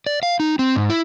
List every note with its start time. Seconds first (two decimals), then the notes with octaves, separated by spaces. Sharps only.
0.06 D5
0.23 F5
0.40 D#4
0.59 C4
0.76 G#2
0.90 E4